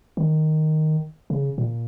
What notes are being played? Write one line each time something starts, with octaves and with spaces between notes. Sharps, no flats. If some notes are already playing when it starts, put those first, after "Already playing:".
D#3
C#3
A#2